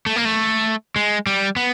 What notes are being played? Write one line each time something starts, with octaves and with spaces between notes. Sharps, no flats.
A3
A#3
A3
G#3
G3
B3